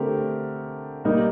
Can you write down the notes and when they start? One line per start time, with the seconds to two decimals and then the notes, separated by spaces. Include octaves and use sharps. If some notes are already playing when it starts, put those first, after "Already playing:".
Already playing: D3 A3 C4 G4 A#4
1.04 G3 A#3 D#4 A#4